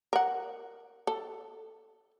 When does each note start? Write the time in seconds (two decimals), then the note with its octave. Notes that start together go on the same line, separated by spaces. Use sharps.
0.13 A#4 F#5
1.07 A4